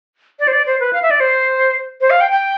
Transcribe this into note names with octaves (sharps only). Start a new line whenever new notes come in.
D5
C5
D5
C5
B4
F5
E5
D5
C5
C5
F5
G5
G5